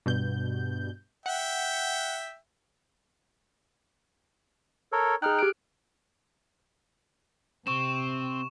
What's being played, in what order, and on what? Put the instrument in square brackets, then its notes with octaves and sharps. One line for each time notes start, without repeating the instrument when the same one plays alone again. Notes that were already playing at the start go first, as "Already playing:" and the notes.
[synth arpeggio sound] G2 B2 G6
[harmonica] E5 G5 [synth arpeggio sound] F#5
[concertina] A4 A#4 C#5
[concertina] D#4 G5 [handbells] G#4 F6 F#6
[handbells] G4 D7
[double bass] C3 [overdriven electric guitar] C4 [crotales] C#6 E7